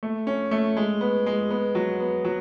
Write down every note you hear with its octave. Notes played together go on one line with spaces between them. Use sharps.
A3
C#4
A3
G#3
B3
G#3
B3
F#3
B3
F#3